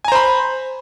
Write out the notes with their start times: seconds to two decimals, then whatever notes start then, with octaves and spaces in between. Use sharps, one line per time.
0.05 G#5
0.08 A#5
0.12 C5
0.15 B5